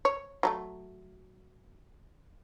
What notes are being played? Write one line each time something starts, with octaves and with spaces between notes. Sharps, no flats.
C#5
F#3 G3 A3